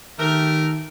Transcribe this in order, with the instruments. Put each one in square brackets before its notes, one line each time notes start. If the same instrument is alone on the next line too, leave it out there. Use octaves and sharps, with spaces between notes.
[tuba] D#3 [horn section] A3 G4 A#4